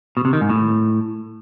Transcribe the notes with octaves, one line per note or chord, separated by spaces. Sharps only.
B2
C3
D#3
G#2
A2